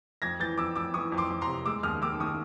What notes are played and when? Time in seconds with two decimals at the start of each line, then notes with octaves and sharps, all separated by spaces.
0.22 F2 G#6 A#6
0.40 E3 G6 A6
0.58 F2 D6 E6
0.76 F2 D6 E6
0.94 E3 C#6 D#6
1.12 F2
1.17 C6 D6
1.30 F2
1.41 A#5 C6
1.48 C3
1.66 G#3 D6 E6
1.83 D#2 D#6 F6
2.02 D#3 D6 E6
2.20 D#3 C#6 D#6